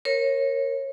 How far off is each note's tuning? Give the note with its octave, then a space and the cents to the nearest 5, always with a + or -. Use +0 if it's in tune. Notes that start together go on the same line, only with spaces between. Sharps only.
A#4 +0 C#5 -25